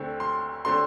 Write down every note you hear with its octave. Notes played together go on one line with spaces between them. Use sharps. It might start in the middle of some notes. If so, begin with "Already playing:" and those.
Already playing: D2 D3 A3 C4
C6
D3 A3 C4 C6